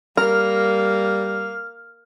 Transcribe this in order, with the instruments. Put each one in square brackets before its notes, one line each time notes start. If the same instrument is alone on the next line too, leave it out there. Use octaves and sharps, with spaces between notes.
[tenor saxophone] G3 [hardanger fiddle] A#3 [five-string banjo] A#4 [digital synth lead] F6